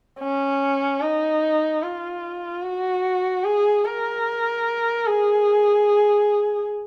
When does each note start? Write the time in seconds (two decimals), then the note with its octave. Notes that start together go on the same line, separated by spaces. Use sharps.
0.19 C#4
1.01 D#4
1.82 F4
2.63 F#4
3.44 G#4
3.85 A#4
5.07 G#4